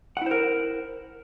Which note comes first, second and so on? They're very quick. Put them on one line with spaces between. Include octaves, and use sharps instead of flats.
F#5 E4 C5 A#4